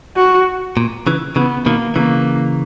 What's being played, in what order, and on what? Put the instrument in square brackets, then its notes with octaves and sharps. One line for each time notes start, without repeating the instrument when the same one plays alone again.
[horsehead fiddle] F#4
[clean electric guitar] A#2
C#3 E3
[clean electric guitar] C#3 E3 [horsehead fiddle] B3
[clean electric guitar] B2 D#3 [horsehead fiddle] A#3
[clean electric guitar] C#3 E3 [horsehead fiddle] A#3